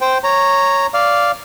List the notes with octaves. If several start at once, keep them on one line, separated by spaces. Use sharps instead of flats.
C5 G5
C#5 A#5
D5 F5